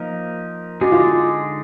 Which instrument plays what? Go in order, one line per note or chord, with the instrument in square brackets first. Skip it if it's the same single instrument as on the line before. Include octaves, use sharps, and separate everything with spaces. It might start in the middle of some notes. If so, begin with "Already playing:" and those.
Already playing: [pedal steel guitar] F3 A#3 D#4 A#4
[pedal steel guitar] D3 G#3 D#4 G#4 D5 [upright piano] F#4
[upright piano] F4